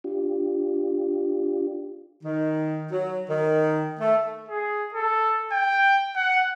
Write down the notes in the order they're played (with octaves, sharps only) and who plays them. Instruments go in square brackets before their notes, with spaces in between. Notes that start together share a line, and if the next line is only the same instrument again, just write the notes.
[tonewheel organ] D4 F4 G4
[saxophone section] D#3
F#3
D#3
A3
[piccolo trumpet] G#4
A4
G5
F#5